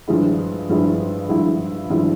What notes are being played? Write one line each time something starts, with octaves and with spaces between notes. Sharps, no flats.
G2 F3 G#3 E4
G2 F3 G#3 E4
G2 F3 G#3 E4
G2 F3 G#3 E4